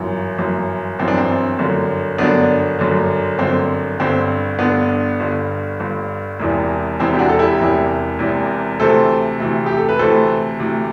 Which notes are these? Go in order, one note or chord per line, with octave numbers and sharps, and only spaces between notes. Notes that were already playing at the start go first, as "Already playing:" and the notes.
Already playing: G1 F#2 E3
G1 F#2 E3
G1 F#2 E3 C4
D4
C4
G1 F#2 D3
G1 F#2 D3 B3 D4
G1 F#2 D3
G1 F#2 D3 C4
G1 G2 D3 C4
G1 G2 D3 B3 D4
G1 G2 D3
G1 G2 D3
E1 E2 C3 E3
E1 E2 C3 E3 C4 E4
G4
D4 F#4
A4
E4 G4
E1 E2 C3 E3
E1 E2 C3 E3
D2 C3 E3 A4 C5
D2 C3 E3
G4
A4
B4
D2 C3 E3 A4 C5
D2 C3 E3